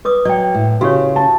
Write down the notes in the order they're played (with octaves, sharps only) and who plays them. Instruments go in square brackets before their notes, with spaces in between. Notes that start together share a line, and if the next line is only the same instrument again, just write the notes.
[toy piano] B4 D6 D#6
[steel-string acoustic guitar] F#3 [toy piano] D5 G5
[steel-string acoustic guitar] A2
[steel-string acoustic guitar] C#3 [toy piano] F#4 G4 C#5
[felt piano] A5